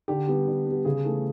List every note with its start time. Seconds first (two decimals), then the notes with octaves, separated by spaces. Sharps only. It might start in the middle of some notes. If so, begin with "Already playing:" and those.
0.08 D3 G4
0.28 G3 B3
0.48 D3
0.66 B3
0.71 G3
0.85 C#3 G#4
1.05 E3 A3 A4